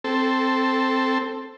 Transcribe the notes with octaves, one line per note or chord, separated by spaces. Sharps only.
C4 A4